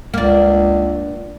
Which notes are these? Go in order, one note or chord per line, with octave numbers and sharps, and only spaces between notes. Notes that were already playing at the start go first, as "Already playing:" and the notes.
C#2 A#3 D4